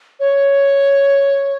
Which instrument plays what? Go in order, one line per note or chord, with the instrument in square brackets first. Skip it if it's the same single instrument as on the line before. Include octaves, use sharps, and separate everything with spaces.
[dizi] C#5